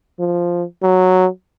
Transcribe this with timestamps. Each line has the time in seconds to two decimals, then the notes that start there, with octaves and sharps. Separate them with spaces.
0.19 F3
0.83 F#3